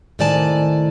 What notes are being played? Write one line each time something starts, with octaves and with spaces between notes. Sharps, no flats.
A2 C3 D#3 D5 G#5 A5